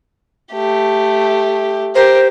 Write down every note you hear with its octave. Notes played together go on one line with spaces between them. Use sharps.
A3 G4
G4 A#4 C5